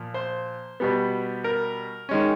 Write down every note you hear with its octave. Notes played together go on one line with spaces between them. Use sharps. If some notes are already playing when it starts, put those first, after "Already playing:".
Already playing: A#2 F3
C5
B2 G3 B3
A#4
D#3 G#3 C#4